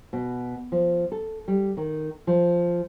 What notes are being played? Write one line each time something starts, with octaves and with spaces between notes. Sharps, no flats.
B2
F3
A4
G3
D#3
F3